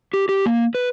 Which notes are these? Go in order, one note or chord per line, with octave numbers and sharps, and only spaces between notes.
G4
G4
A#3
B4